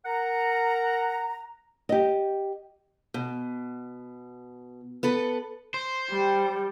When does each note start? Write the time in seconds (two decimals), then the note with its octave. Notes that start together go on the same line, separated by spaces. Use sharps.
0.06 A#4 F#5 A#5
1.89 G4 D#5
3.14 B2
5.03 B3 A4 B4
5.74 C5
6.10 G3 G5